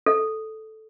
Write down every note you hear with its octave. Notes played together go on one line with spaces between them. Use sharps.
A4